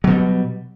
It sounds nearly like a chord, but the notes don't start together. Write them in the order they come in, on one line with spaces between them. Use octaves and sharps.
F#3 B2 G3